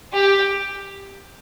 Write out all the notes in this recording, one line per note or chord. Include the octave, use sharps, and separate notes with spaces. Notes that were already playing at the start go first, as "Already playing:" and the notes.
G4